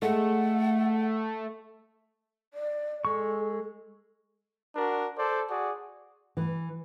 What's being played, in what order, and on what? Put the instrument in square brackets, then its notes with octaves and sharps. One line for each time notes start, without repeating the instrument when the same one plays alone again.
[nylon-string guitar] G#3 A4 [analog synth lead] A3 [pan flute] F#5
[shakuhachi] D5
[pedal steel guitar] G#3 C#6 [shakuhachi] A4
[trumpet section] D4 F#4 A#4
A4 C5 D5
F#4 G#4 D5
[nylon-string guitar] E3